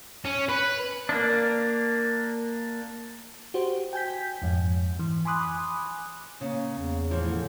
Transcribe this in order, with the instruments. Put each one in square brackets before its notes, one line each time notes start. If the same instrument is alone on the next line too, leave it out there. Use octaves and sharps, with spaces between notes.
[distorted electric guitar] C#4
B4
[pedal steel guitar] A#3 D4
[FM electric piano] F#4 G4 C5
G5 G#5 G6 B6
F2 G#2
E3
G#5 B5 C6 D6 D#6 F#6
[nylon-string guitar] C#3 [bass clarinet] A#3
[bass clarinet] E2
[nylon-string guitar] A2 E3 F3
[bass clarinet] D3